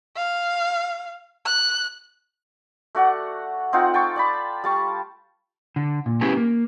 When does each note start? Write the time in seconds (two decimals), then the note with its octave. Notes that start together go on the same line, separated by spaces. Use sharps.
0.16 F5
1.46 F#6
2.95 A3 F#4 D5 F#5
3.73 C4 D#4 F4 F#5
3.94 G5 A5 C#6
4.16 D5 A5 B5
4.64 G3 A5 C#6
5.76 D3
6.06 A#2
6.21 G#3 B3 C#4 E4 G4 G#4
6.37 A#3